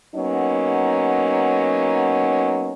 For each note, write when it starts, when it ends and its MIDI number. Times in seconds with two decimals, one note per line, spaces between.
0.15 2.73 54
0.15 2.73 58
0.15 2.73 59
0.15 2.73 61
0.15 2.73 63